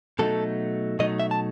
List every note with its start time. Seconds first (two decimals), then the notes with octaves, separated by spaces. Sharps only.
0.19 B2 F#3 A3 D#4 A4
0.99 B2 F#3 A3 D#4 D#5
1.20 E5
1.31 A5